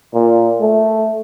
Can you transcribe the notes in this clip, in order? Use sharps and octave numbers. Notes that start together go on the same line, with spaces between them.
A#2
A3